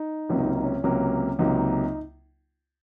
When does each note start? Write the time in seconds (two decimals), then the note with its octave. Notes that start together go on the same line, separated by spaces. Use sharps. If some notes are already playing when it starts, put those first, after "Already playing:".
Already playing: D#4
0.29 C#2 C3 F#3 A#3 C#4
0.38 D#4
0.46 C#4
0.55 D#4
0.64 C#4
0.84 C#2 C3 F#3 A#3 C#4
1.39 C#2 C3 F#3 A#3 D#4